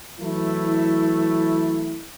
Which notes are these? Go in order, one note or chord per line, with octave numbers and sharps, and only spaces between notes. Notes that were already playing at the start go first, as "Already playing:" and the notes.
E3 F#3 A3 E4